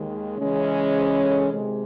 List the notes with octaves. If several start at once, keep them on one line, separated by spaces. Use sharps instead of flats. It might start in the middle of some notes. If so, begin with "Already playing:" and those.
Already playing: D#2 D#3 G#3
C#3 E3 G#3 C#4
C5
A4
C3 D#3 G#3